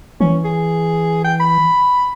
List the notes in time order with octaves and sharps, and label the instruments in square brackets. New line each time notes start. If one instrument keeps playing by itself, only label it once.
[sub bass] E3 [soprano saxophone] C#4
[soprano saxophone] G#4
G5
B5